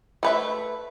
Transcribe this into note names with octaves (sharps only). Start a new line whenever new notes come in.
A3 B4 E5